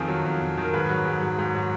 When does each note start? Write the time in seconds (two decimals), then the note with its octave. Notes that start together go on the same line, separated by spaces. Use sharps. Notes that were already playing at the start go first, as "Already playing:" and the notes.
Already playing: F2 D#3 F3 G#4
0.08 F#3
0.25 F2
0.41 F2
0.58 D#3
0.65 A#4
0.73 G#2 B4
0.90 F#3
1.06 G#2
1.21 F#3
1.38 G#2
1.55 F#3